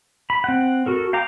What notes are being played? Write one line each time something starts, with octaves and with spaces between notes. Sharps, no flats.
B5
C4 F#5
F#4 A4 A#4
F5 G5 A#5 D6